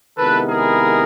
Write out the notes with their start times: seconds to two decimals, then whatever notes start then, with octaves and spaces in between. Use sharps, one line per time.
0.17 C3 D#3 G#3 B3 E4 A4 B4
0.48 G#4 A#4